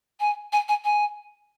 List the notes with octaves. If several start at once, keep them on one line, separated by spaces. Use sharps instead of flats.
G#5
G#5
G#5
G#5